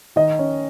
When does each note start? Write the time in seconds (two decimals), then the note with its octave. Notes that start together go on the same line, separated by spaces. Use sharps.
0.16 D#3 D#5
0.39 C#4